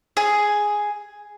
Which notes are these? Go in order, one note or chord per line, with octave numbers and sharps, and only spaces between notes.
G#4